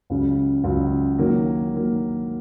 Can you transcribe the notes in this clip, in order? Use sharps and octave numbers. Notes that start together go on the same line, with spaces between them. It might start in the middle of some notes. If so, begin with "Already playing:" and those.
C#2 C#3 F#3
C#2 C#3 F#3
D#3 F#3 A#3
D#3 F#3 A#3